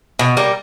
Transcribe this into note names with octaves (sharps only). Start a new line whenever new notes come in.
B2
G3 A#3